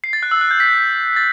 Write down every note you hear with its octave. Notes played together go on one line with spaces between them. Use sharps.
C7
A6
F#6
E6
F#6
G6
B6
A6